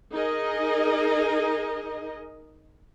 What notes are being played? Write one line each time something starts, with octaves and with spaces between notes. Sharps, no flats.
D#4 G#4 A#4 D#5